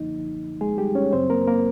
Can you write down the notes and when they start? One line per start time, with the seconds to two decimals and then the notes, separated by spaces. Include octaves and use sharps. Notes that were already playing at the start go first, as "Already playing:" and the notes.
Already playing: F#2 D3 F3 A#3 D#4
0.61 G#3 G#4
0.78 G3 G4
0.95 C#4 C#5
1.13 F#2 C#3 F#3 C4 C5
1.30 A#3 A#4
1.47 A#3 A#4